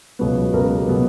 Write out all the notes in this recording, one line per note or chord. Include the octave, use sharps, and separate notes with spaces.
C#2 B2 F#3 B3
C#2 B2 F#3 B3 A#4
B4
G4
B2 F#3 B3